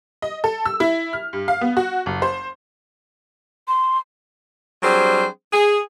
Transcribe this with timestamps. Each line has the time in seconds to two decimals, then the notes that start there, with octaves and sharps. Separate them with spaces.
0.22 D#5
0.44 A4
0.66 E6
0.80 E4
1.13 F6
1.33 G2
1.48 F5
1.61 B3
1.77 F#4
2.06 F#1
2.22 C5
3.68 C6
4.83 F#3 G3 C4 D4 G#4 C5
5.53 G#4